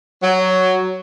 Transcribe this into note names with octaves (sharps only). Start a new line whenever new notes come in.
F#3